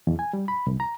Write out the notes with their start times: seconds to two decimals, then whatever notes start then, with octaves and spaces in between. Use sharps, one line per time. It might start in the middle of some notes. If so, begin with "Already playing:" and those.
0.07 E2
0.19 G#5
0.33 G3
0.48 B5
0.67 C2
0.80 A#5